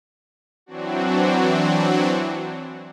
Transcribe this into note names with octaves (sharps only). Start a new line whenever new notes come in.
E3 F#3 C4 D4 F#4